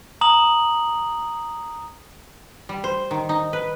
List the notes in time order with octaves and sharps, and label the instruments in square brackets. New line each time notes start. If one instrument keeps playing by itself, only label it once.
[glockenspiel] A#5 D#6 F#7
[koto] G3
C5
D#3
D#4
B4